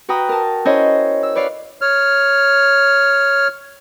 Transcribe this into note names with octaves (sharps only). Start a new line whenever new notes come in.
F#4 B4 G5 A#5 D#6
A#4 A5
C#4 E4 C5 C#5 D#5
E6
B4 C#5 D5 F5
C#5 F6